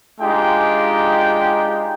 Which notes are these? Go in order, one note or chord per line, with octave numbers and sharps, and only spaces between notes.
G#3 D4 D#4 F4 G4 G5